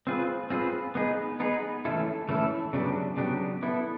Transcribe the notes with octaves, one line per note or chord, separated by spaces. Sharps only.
C4 F4 G#4 B4
C4 F4 G#4 B4
B3 D#4 G#4 B4
B3 D#4 G#4 B4
E3 A3 C#4 E4 A4
E3 A3 C#4 E4 A4
C#3 F#3 B3 D4 G4
C#3 F#3 B3 D4 G4
B3 E4 A4